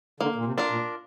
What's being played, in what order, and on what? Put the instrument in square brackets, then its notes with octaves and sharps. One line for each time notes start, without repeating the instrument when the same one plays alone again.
[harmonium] D3 [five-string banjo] A#3
[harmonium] A#2
C3
[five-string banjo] D4 F4 A#4
[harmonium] A#2